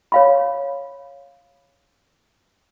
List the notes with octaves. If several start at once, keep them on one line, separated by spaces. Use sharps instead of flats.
C#5 F5 B5